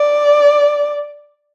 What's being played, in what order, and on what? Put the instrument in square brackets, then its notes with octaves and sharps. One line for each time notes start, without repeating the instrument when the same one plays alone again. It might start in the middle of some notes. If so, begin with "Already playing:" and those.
Already playing: [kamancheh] D5